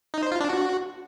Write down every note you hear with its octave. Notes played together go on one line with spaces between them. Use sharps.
D#4
C5
F4
D4
F#4